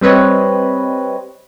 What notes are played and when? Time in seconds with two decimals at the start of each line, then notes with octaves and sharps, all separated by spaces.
0.01 G3 C4 B4 C#5 D#5